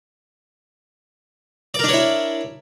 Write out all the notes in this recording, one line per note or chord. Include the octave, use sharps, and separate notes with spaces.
D4 E4 A#4 C#5 D5